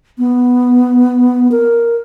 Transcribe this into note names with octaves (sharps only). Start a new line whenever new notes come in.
B3
A#4